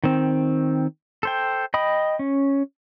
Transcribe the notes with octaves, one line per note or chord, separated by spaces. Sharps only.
D#3 C4
A4 C5 G5
D#5 G5 B5 D#6
C#4